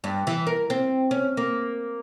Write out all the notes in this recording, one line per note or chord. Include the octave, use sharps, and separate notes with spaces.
G2
E3
A#4
C4
C#4
A#3